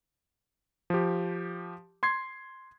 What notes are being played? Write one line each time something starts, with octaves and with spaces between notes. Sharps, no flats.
F3 G4
C6 G#6 C7